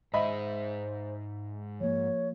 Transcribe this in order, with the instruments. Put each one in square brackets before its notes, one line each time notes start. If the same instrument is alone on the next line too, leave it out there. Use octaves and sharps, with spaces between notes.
[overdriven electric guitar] G#2 G#3 [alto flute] C5 [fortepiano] D#5 E5 B5
[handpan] F3 A#3 [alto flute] C#5